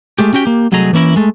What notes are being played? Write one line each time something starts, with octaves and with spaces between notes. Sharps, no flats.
G#3 A3 G4
C#4 F#4 G4 G5
A#3 G4
C2 F#3 A3 G#4 D#5 A#5
E3 A#3 C#4 E4 A#4
G#3 A3